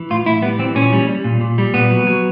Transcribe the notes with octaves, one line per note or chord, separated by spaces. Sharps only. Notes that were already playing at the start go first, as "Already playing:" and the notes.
Already playing: E3
A2 F4
A2 E4
G3 B3
E3 C4
A#2 C#4
G3
G3
A#2
A#2
G3
A#2 B3
F#3
F#3